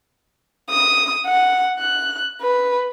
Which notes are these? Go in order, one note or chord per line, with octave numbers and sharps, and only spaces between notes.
D#6
F#5
F#6
B4